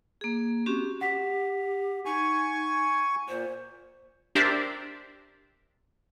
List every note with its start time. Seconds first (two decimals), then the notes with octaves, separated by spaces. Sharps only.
0.21 A#3 G#4
0.66 C4 C#4 F#4 G4
1.01 G4 F#5 B6
2.06 D#4 G#5 C#6
3.28 A#2 C5
4.35 D4 G4 A#4 C5 D5 E5